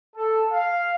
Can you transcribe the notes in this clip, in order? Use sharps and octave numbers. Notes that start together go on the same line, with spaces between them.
A4
F5